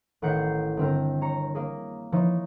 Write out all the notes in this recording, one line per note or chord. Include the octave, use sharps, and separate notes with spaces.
A1 D#3 F#5 G6 C7
G1 C4 A#4
C#5 A#5 C#7
A#3 G#4
E3 F3 D#4 C#5